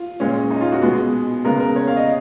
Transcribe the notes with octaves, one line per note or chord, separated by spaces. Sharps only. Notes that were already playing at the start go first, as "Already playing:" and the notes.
Already playing: F4
A#2 G#3 C#4
D#4
F4
F#4
B2 G#3 B3 G#4
C#3 G#3 B3 A#4
A#4
C#5
F5
D#5